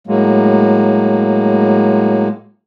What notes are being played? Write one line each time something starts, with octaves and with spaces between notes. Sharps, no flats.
A2 F#3 G#3 A#3